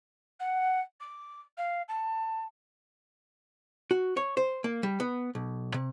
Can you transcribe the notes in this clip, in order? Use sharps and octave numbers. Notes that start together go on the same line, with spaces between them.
F#5
D6
F5
A5
F#4
C#5
C5
A#3
G3
B3
B1
C3